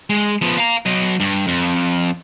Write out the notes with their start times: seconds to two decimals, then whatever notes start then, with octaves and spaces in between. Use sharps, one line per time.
0.10 G#3
0.42 F3 B3
0.57 F5 A#5
0.86 F#3 D#5
1.20 G2
1.47 F2